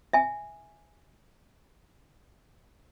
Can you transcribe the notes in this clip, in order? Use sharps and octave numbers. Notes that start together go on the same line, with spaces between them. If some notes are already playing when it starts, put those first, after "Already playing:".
E5 G#5